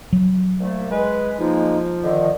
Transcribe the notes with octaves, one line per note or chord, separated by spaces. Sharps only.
F#3
C2 A3 A#3
G#3 B4
F3 G#3 A#3 D#4
D3 D#3 D#5